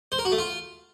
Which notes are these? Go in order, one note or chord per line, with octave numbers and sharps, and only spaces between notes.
C5
A#4
F#4
A3
F4